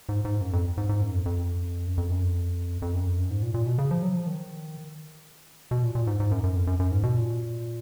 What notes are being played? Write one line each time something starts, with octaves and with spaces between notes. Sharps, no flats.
G#2
G#2
F#2
F2
G#2
G#2
F#2
F2
F2
F#2
F2
F#2
F2
F2
F#2
F2
F#2
G#2
A#2
A#2
B2
C#3
F3
F#3
F3
D#3
B2
A#2
A#2
G#2
G#2
F#2
F#2
F2
F#2
F#2
G#2
B2
A#2